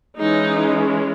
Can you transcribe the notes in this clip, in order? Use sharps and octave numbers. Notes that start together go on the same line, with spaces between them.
E3 G#3 C#4 D#4